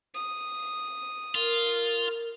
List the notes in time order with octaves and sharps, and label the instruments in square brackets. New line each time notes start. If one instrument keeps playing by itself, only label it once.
[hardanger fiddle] D#6
[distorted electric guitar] F4 [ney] A#4